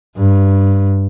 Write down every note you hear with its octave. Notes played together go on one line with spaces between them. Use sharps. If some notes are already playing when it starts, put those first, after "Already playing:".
G2